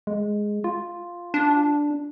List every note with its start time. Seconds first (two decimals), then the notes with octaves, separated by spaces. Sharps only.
0.07 G#3
0.64 F4
1.34 D4